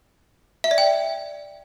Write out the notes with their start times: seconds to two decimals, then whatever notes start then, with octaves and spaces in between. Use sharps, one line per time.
0.64 E5
0.71 D5
0.78 G5